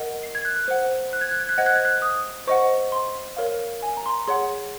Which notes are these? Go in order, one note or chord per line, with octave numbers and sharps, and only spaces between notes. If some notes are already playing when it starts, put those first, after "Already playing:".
Already playing: A#4 D#5 F#5
C7
G#6
F#6
F#6
C5 F#5
F#6
G#6
F#6
G#6
F#6
C5 D#5 F#5 G#6
F#6
G#6
F#6
D#6
C5 D#5 F#5 C#6
C6
A#4 C#5 F5
G#5
A#5
C6
A#5
G#4 C#5 F#5 C6